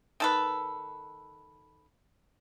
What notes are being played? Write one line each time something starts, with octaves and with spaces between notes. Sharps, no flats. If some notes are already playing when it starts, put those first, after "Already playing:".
D#3 A4 B4